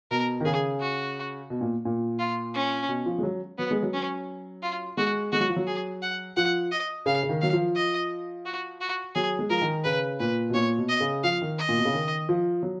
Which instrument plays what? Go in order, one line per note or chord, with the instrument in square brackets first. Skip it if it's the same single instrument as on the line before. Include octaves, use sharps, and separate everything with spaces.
[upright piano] B2 [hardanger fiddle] A#4
[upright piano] D#3
[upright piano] C#3 [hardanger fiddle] G#4
[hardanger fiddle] F#4
[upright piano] B2
A#2
A#2
[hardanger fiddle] F4
C#4
[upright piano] B2
F3
G#3
F#3
[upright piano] F#3 [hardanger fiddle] B3
[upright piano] G#3
F#3
[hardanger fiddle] C#4
F4
[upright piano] G#3 [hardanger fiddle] F#4
[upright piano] G#3 [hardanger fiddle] F#4
[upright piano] F#3
F3
F#3
[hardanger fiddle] G#4
F#5
[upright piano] F3 [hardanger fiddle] F#5
[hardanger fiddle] D#5
[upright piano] C#3 [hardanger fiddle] F5
[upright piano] C#3
D#3
[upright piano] F#3 [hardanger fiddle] F5
[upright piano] F3
[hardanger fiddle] D#5
F#4
F#4
[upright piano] F#3 [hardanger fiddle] G#4
[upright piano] G#3
[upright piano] F3 [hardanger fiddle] A#4
[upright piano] D#3
[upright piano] C#3 [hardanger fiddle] B4
[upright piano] A#2 [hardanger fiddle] B4
[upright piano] B2
[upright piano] A#2 [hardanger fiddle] C#5
[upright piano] B2
[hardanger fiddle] D#5
[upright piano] C#3
[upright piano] F3 [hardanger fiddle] F5
[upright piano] D#3
[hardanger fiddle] D#5
[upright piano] A#2
B2
C#3
D#3
F3
F#3